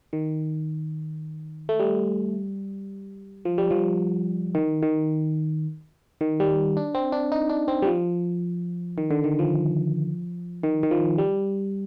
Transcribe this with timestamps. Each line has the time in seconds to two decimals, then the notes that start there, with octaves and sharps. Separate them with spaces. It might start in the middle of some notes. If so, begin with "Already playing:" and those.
0.13 D#3
1.69 A3
1.80 G3
3.45 F3
3.58 G3
3.71 F3
4.55 D#3
4.83 D#3
6.21 D#3
6.40 G3
6.77 D4
6.95 C4
7.12 D4
7.32 D#4
7.49 D4
7.68 C4
7.82 G3
7.87 F3
8.98 D#3
9.11 D3
9.24 D#3
9.39 F3
10.63 D#3
10.83 D#3
10.91 F3
11.18 G3